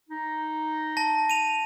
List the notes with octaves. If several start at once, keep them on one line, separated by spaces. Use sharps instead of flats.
D#4
A5 A#6
D#7 F7